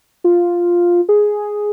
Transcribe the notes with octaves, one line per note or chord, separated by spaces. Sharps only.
F4
G#4